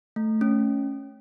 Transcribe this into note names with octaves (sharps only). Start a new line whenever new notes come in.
A3
C#4